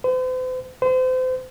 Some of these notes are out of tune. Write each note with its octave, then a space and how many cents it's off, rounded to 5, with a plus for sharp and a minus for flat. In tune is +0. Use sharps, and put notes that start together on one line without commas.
C5 -45
C5 -35